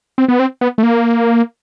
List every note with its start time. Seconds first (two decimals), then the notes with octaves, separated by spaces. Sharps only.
0.18 C4
0.28 B3
0.39 C4
0.61 B3
0.78 A3
0.83 A#3